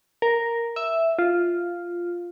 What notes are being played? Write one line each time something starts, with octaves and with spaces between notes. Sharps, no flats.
A#4
E5
F4